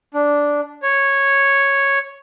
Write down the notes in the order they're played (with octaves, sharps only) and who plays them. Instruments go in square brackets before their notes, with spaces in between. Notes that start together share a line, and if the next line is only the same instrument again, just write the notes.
[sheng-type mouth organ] D4
C#5